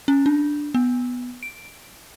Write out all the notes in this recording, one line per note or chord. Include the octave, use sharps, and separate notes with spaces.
C#4
D4
B3
D7